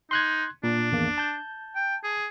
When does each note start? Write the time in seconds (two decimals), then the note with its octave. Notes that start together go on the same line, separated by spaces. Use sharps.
0.11 D#4 C6 F#6 G#6
0.64 A#2 D4
0.91 G#1 E2 A#3
1.18 A5 G6
1.76 G5
2.04 G#4